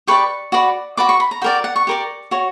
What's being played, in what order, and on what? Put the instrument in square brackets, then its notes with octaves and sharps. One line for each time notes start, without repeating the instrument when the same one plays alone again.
[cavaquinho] G4 B4 D5 C#6
F#4 B4 D5
F#4 B4 D5 D6
C#6
B5
A#5
F#4 A#4 D5 G5
F#5
C#6
G4 A#4 D5
F#4 C#5